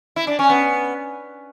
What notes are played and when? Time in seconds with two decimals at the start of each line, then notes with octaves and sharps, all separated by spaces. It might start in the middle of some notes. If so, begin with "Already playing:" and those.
0.16 E4
0.27 D4
0.39 C#4
0.50 B3